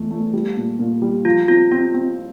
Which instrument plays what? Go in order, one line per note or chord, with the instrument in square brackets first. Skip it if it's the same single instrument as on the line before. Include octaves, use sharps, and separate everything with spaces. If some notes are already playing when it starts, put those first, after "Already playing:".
Already playing: [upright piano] E2 A3
A3
G3
A#2
A#2
G3
[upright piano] F3 [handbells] F4
[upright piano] C4 [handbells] F4
[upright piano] C4 [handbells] F4
[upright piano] C4